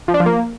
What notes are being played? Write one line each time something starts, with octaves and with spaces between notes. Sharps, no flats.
F3
D4
F3
A#3